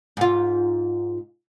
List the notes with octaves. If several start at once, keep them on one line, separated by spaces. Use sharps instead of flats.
G#2 F4